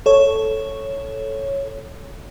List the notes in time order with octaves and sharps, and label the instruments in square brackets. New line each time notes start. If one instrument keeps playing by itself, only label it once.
[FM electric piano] A4 C#5